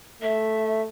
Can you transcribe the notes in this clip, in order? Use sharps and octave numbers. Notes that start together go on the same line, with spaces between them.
A3 E5